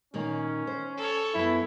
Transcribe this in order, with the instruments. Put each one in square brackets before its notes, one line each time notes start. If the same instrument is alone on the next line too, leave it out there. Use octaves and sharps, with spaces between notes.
[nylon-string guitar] A#2 D#3 A#3 [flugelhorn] C#4
[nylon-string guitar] C5
[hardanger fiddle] A4 C#5
[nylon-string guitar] F#2 B3 [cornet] E4